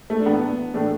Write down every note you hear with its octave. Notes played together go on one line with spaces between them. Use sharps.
A3
D4
A2 E3 B3
A2 E3 A3 D4